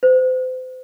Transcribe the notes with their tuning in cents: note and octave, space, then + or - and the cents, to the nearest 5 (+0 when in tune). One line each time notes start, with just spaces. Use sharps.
C5 -35